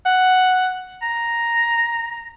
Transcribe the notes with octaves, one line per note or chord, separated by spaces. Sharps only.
F#5
A#5